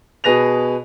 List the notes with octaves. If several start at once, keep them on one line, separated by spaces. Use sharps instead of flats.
B2 G#4 B4 A#6 F7